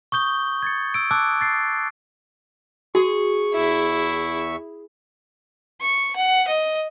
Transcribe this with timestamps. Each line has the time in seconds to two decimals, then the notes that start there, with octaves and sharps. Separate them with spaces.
0.12 C#6 D#6 G6 G7
0.62 G#6 A6 C#7
0.94 E6 D7
1.11 A5 D6 E6 F#6
1.41 A6 C7 D7
2.95 F#4 G#4 C#6
3.54 E2 E4 E5 C#6
5.81 C#6
6.16 F#5
6.48 D#5